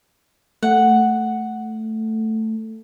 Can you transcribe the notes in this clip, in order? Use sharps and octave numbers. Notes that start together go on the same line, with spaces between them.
A3 F#5